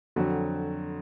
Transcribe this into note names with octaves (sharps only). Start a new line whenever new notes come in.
F2 D3 F#3 F#4